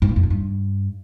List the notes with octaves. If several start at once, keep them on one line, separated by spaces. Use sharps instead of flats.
G#2
A#2
F2
D#3
G2